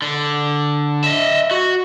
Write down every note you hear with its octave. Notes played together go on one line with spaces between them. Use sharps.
D3
D#5 E5
F#4